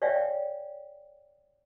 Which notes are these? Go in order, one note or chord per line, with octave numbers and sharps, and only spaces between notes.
C#5 D5 E5 F5 G5 G#5